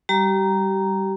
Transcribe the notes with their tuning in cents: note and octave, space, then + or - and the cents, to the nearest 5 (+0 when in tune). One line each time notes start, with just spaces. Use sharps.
G3 +0 G4 -35 A#5 +0